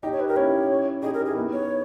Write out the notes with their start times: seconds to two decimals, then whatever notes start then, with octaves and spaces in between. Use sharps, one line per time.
0.03 D#4 G4 D#5
0.12 C#5
0.20 B4
0.28 G4 A#4
0.36 C#4 E4 C#5
1.02 D#4 G4 G#4
1.14 A#4
1.25 G#4
1.31 E4
1.36 B3 D#4
1.53 C#5